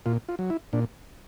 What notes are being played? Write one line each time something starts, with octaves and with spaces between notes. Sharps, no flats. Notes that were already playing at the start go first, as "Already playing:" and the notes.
A#2 F4
F4
F#3
E4
A#2 D4